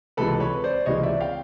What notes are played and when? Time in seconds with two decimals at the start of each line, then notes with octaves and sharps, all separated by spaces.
0.17 C#2 C3 E3 G#3 A4 B4
0.40 B4 C#5
0.64 C5 D5
0.86 C#2 C3 E3 G#3 C#5 D#5
1.03 D5 E5
1.20 F5 G5